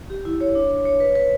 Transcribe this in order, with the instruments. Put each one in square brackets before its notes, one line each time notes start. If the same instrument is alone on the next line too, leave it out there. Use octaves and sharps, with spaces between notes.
[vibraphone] G4
E4
C#5
D4
C#5
C#5
B4
B4